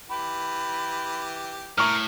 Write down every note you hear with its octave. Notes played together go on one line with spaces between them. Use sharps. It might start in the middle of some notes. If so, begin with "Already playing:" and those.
E3 G4 B5
A2 A#4 A#5 C#6 F6